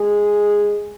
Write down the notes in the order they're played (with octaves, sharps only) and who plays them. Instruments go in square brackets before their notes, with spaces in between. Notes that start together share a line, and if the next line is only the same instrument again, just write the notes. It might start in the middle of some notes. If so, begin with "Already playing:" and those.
Already playing: [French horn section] G#3 G#4